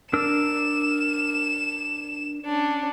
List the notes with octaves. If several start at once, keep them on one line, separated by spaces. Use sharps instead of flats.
D4 A#4 E6 E7
C#4 D4